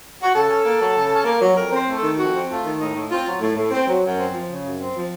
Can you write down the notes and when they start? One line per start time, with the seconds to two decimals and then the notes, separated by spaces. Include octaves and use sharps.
0.22 F#4
0.33 C#3 A4
0.48 C#4
0.64 A#3
0.79 F#3
0.95 C#3
1.09 C#4
1.25 A#3
1.41 F#3
1.56 F2 A#4
1.72 C4 C5
1.86 A3
1.97 D#3 A4
2.17 F2 F#4
2.33 C4
2.49 A3 F4
2.64 D#3
2.79 A2 D#4
2.95 A2
3.10 C4 F4
3.26 F#3
3.41 A2
3.56 A2
3.71 C4
3.88 F#3
4.03 F#2
4.18 C4
4.33 F3
4.48 C#3
4.64 F#2
4.80 C4
4.95 F3